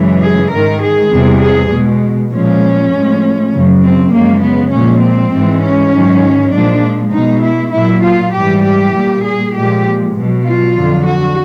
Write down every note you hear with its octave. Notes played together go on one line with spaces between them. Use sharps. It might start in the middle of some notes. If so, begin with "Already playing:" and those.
Already playing: F#2 C#3 E3 G#3
G#4
G#2 D#3 G#3 A#4
G#4
E2 C3 E3 G3
G#4
B2 G#3
A#2 F3 G#3 C#4
A2 F3 G#3
F#2 C#3 F#3
C4
F#2 C#3 F3 G#3 A#3
B3
A#2 F3 G#3 C#4
C4
G#2 E3 G#3
C#4
G#2 D#3 F#3
A#2 F3 G#3 D4
B2 G#3 D#4
E4
A#2 F#3 E4
F4
G#2 E3 G3 G4
G4
A#2 G3
G#4
A#2 F3 G#3 G4
B2 F#3
F4
F2 D3 F#3
F#4